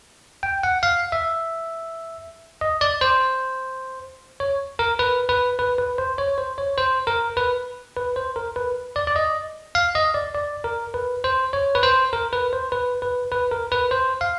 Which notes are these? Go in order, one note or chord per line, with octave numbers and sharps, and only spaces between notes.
G5
F#5
F5
E5
D#5
D5
C5
C#5
A#4
B4
B4
B4
B4
C5
C#5
C5
C#5
C5
A#4
B4
B4
C5
A#4
B4
D5
D5
D#5
F5
D#5
D5
D5
A#4
B4
C5
C#5
B4
C5
A#4
B4
C5
B4
B4
B4
A#4
B4
C5
F5